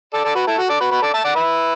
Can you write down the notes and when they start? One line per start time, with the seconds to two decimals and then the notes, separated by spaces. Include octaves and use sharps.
0.13 A4 D5
0.25 A4 D5
0.35 F#4 B4
0.47 E4 A4
0.58 F#4
0.69 A4 D5
0.80 F#4 B4
0.91 F#4 B4
1.02 A4 D5
1.14 E5 A5
1.24 D5 F#5
1.35 B4 E5